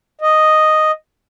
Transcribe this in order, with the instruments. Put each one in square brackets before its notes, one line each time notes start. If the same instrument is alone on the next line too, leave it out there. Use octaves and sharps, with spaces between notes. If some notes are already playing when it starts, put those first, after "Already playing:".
[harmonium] D#5